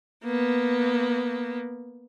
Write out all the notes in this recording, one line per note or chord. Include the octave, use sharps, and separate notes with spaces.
A#3 B3